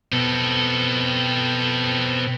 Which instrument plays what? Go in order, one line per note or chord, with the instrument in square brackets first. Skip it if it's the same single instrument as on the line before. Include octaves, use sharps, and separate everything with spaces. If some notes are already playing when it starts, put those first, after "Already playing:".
[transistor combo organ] B2 [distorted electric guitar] C4 A4